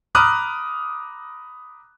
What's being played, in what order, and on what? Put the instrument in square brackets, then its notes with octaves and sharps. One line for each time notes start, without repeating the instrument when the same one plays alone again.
[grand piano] A#5 B5 D6 D#6 F6 F#6